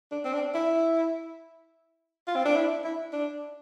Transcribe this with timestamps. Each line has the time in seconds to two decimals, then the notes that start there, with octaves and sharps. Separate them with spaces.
0.11 D4
0.25 C4
0.33 D4
0.54 E4
2.27 F4
2.36 C4
2.45 D4
2.56 E4
2.84 E4
3.13 D4